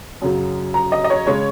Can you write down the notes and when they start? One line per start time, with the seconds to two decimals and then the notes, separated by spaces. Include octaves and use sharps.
0.22 F#2 C#3 F#3
0.74 A#5
0.92 D#5
1.04 D#5
1.10 C#5
1.27 C#3 G#3 C#5